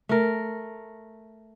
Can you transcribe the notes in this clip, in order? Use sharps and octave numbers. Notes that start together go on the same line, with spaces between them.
A3 A#4